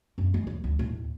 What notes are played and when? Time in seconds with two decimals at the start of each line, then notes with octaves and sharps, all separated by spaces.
0.18 F#2 A#3
0.34 G#3
0.47 D#2
0.64 D2
0.79 D#2 A2